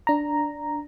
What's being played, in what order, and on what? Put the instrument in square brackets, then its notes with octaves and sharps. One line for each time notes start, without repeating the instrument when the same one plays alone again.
[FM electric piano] D4 A#5